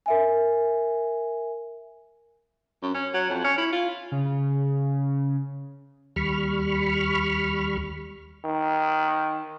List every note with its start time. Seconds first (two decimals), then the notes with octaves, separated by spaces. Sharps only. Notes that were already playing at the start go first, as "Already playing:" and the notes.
0.06 A#4 E5 G#5
2.82 F#2
2.94 C#4
3.14 F#3
3.29 F2
3.44 C#4
3.57 E4
3.72 F4
4.12 C#3
6.16 D#2 G3 B5 C#6 F6
8.45 D#3